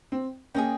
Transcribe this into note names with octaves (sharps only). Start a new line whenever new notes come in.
C4
A#3 C#4 G#4 D#5 G5